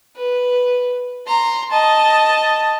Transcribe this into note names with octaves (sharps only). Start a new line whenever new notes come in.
B4
A#5 C6
D#5 A5